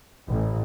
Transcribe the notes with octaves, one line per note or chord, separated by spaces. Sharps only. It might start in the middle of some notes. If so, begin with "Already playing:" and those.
A1